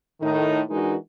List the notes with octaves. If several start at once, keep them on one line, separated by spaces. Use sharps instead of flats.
A2 D#3 D#4
E3 G#3 D4 D#4 F#4 A#4